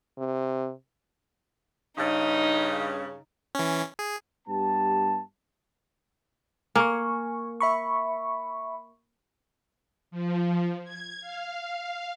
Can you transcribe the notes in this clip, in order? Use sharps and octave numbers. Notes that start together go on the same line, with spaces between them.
C3
G2 C#3 D#4
E3 C#4
G#4
G2 B3 G4 A5
A#3 G#5 C#6
E5 B5 C#6
F3
G#6
F5